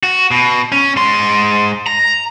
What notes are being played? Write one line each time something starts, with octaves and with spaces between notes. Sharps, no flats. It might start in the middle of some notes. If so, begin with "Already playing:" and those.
F#4
B2
C#4
G#2 C6
A#5